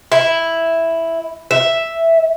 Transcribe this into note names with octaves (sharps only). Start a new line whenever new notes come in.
E4
E5